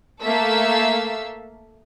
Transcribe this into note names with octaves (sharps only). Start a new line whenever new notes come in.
A3 A#3 A4 E5 F5 E6